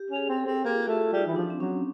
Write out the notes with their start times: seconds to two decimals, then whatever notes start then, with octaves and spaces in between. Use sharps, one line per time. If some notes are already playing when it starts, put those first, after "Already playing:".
Already playing: G4
0.10 C#4
0.16 G#4
0.29 C4
0.37 A4
0.40 G#4
0.46 C4
0.65 A#3 G4
0.74 F4
0.83 F#4
0.88 A3
1.01 F4
1.13 G3
1.18 D#4
1.26 E3
1.36 F3 D4
1.50 C4
1.60 F#3 C#4